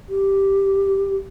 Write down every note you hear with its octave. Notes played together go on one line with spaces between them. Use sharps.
G4